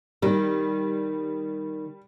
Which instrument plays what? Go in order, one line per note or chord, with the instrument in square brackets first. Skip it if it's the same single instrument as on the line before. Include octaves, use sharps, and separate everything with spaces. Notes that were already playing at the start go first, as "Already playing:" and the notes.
[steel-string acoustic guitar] D#3 [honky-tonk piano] G3